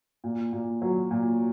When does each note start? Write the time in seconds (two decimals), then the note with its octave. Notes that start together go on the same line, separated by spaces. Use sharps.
0.24 A#2
0.53 A#2
0.82 F#3
1.11 A#2